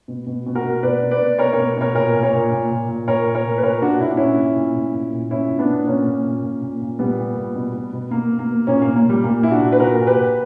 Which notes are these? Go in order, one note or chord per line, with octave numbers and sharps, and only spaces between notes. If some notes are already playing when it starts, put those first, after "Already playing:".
B2
B2
B2
F#4 A#4
B2
B2 B4 D5
B2
B4 D5
B2
B2 A#4 C#5
B2 A#4 C#5
B2 A#4 C#5
A#2 A#4 C#5
A#2
A#4 C#5
A#2
A#2
A#2
A#2
A#2 A#4 C#5
A#2
A#4 C#5
A#2
B4
A#2 A#4 C#5
A#2 D4 F#4
A#2 E4
D4
A#2 C#4 E4
A#2
A#2
A#2
A#2
A#2
A#2 C#4 E4
A#2
B3 D4
A#2
A#2 A#3 C#4
A#2
A#2
A#2
A#2
A#2
A#2 G3 B3
A#2
A#2
B2
B2
B2
B2 A#3
B2
A#3
B2
A#2 A#3 C#4
A#2 A#3
A#3
A#2 G3
A#2 A#3
A#2 E4
D4 F#4
A#2
B4
A#2 F#4 A#4
A#2
G4 B4
A#2